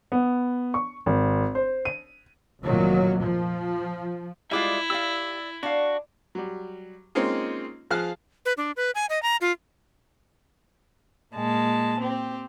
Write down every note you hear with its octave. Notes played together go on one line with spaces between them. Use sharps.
B3
C#6
G#1
C5
D#7
F1 A#2 D#3 F#3
F3
G3 G#3 E4 F4 E5 D6
G4 D5 F5 E6
D4 F#4 F5
F#3 G3
G#3 A#3 C4 C#4 D#4 F4
F3 G#4 F5 F6 F#6
B4
D4
B4
G#5
D#5
A#5
F4
A#2 G#3 A5
C4 G4